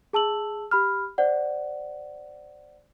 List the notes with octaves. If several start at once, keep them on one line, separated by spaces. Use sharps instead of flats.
G#4 A5 E6 F#7
G4 B5 F6
C5 D5 F#5